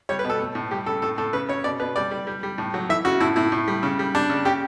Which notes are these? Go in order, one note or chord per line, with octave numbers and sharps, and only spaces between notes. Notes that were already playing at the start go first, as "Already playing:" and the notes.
G3 C#5
B4
B2 A4
A3
A2
G3 G4
C#3 A4
A2 A4
A2 A4
C#3 B4
C#3 C#5
B2 D5
B2 B4
G3 D5
G3
G3
G3
A2
F#3
E3 E5
C#3 F#4
A2 E4
A2 E4
A2
G3
C#3
G3
G3 D4
C#3
C#3 G4